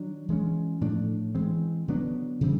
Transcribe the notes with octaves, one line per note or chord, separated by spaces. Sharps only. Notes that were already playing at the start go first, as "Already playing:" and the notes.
Already playing: D#3 F#3 D4
E3 G#3 C#4
A2 F3 A3 D4
E3 G#3 C4
D3 F#3 B3 D4
C#3 E3 G3 C4